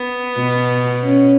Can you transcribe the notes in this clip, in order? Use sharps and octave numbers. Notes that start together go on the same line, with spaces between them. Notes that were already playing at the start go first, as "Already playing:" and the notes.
Already playing: B3
B2
C#4